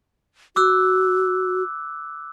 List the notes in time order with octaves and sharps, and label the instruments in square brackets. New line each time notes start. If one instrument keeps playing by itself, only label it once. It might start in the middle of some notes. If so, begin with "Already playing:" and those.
[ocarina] F#4 [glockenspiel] D6 E6 F#6